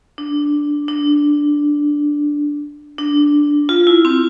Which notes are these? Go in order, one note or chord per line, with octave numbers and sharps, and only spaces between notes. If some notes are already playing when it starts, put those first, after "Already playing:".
D4
D4
D4
F4
E4
C4